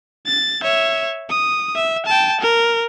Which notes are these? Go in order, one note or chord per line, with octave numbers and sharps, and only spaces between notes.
A6
C#5 E5
D#6
E5
G5 A5
A#4